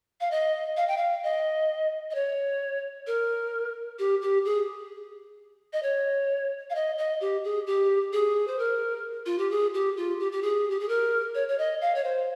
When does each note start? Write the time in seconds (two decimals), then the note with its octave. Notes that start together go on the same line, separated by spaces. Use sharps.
0.20 F5
0.31 D#5
0.77 F5
0.88 G5
0.97 F5
1.23 D#5
2.11 D#5
2.15 C#5
3.07 A#4
3.99 G4
4.22 G4
4.45 G#4
5.73 D#5
5.83 C#5
6.70 F5
6.75 D#5
6.98 D#5
7.21 G4
7.44 G#4
7.67 G4
8.13 G#4
8.48 C5
8.59 A#4
9.26 F4
9.38 G4
9.51 G#4
9.74 G4
9.97 F4
10.20 G4
10.32 G4
10.42 G#4
10.71 G4
10.80 G#4
10.88 A#4
11.35 C#5
11.48 C#5
11.58 D#5
11.81 F5
11.95 C#5
12.04 C5